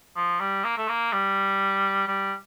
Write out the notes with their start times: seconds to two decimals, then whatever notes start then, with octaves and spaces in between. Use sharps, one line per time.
0.17 F3
0.41 G3
0.64 A#3
0.78 A3
0.89 A#3
1.13 G3
2.08 G3